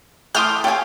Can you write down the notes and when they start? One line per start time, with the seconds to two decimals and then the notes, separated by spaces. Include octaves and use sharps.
0.35 E3 A3 A4 C6 D6 D#6 F6 G6
0.64 G4 A4 C#5 F5 G#5